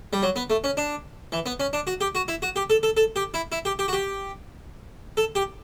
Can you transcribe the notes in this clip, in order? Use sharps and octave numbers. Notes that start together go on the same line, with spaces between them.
G3
F#3
B3
A3
C#4
D4
E3
B3
C#4
D4
F#4
G4
F#4
E4
F#4
G4
A4
A4
A4
G4
E4
E4
G4
G4
F#4
G4
A4
G4